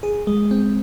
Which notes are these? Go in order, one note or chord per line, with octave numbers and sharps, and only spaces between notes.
G#4
G#3
C4